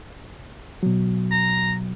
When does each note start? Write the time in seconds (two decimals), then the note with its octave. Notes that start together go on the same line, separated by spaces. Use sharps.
0.83 B2 F#3
1.32 A#5